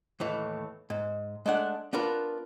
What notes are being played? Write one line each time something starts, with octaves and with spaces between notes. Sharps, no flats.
D#2 A2 E3
G#2
G#3 A3 D4 F#5
B3 D4 F4 A#4 B4